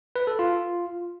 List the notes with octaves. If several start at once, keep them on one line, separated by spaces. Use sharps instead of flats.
B4
A4
F4